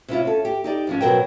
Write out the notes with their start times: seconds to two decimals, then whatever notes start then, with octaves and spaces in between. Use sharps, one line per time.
0.08 C3 C#4 E4 F4
0.25 C#4 A4
0.45 G4
0.64 D#4 G4 D5
0.87 G#2 F3 C#4
1.01 B2 D#3 F#3 A#4 C5 G5